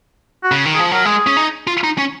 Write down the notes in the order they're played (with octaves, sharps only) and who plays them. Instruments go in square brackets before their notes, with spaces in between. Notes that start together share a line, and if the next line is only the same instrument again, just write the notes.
[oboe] F#4
[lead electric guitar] C#3
D#3
[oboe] G#4
[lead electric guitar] F3
[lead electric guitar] F#3 [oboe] A#4
[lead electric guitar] G#3 [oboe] G#4
[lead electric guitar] C#4
D#4
F4
D#4
C#4